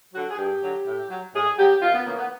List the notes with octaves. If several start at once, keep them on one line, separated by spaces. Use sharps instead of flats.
D3 F#3 F#4
G#4
G2 G4
D3 F#3
A2
F#3
A2 G#4
F#3 G4
F#2 F4
B3
C#3 E3 A#3
B3